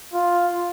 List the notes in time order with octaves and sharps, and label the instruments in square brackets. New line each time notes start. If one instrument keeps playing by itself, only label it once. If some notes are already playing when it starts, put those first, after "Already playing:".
[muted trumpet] F4